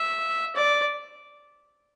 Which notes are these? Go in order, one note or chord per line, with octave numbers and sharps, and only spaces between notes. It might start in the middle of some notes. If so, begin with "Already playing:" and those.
Already playing: E5
D5